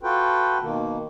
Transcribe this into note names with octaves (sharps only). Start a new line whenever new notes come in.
F4 F#4 A4 B4 G5
B2 D#3 A#3